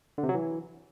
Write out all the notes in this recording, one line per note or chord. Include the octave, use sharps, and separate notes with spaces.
D3
C3
F#3
E3